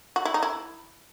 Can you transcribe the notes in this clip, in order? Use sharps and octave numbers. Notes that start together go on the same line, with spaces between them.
F#4
E4
D#4
E4